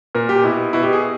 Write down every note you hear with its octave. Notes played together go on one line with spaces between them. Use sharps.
A#2 A#4
G4
B2 E4
B2 E4
G4
G#4